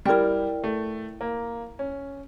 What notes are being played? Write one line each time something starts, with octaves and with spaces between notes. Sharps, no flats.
G3 E4 A#4 D5 G5
A3
A#3
C#4